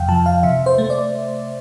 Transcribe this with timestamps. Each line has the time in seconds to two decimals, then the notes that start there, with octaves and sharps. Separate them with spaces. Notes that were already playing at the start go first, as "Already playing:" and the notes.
Already playing: F2 C3 F5 G5
0.09 F3 A5
0.26 F5
0.43 C3 E5
0.66 C5
0.78 A3
0.90 D5